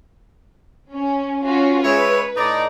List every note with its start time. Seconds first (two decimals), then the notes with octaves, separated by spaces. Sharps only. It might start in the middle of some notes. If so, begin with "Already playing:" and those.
0.90 C#4
1.42 C#4 F4 F#4
1.83 G#3 B4 C#5 E5
2.36 A2 D#4 D5